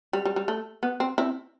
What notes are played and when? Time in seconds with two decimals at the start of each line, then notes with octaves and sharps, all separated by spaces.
0.13 G3
0.25 G3
0.36 G3
0.48 A3
0.83 B3
1.00 C4
1.18 C4 E4